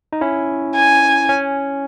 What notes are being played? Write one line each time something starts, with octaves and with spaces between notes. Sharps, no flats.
D#4
C#4 E4
G#5
C#4